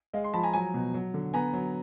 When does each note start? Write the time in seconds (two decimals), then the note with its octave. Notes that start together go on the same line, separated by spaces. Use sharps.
0.13 G#3 D#5 F5
0.24 C6
0.34 F3 A5 B5
0.43 G#5 A#5
0.53 F#3 G#5 A#5
0.74 B2
0.94 F#3
1.14 D3
1.34 B3 G#5 A#5
1.53 F#3